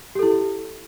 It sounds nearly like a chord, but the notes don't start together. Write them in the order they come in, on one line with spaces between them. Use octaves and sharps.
G4 A4 E4